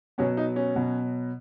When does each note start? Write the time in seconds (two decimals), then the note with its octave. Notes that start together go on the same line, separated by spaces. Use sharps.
0.18 B2 F#3 B3 C#4
0.37 D#4
0.56 C#4
0.76 B2 F#3 B3